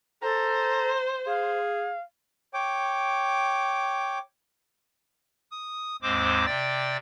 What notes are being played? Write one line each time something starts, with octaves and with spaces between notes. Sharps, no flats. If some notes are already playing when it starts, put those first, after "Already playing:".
A4 C5 A#5
G#4 F5
C#5 G5 D6
D#6
D#2 G#2 G#3 C4 C5 D6
C3 D5 G5 A6